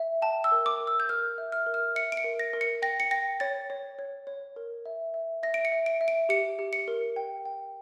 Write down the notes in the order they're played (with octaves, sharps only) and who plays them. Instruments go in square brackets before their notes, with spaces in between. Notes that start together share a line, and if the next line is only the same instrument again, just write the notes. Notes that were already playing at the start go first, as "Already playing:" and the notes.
Already playing: [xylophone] E5
G5 A5
E6
A#4
D6
A#4
E6
G6
A#4 F6
E5
F6
A#4
F6
E5 C#7
D7
C#7
A#4
A#6
A#4
C#7
G5 A#6
C#7
G5 A#6
C#5 A6
C#5
C#5
C#5
A#4
E5
E5
E5 A#6
D7
C#7
E5
D7
E5
D7
G4 C#7
G4
C#7
A#4
G5
G5